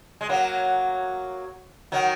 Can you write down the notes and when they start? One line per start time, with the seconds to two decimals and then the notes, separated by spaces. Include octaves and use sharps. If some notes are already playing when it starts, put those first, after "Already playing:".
0.21 G#3
0.29 F#3 A#3
1.92 D#3 F#3